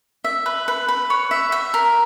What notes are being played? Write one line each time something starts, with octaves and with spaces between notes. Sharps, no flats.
E5
B4
B4
B4
C#5
E5
E5
A#4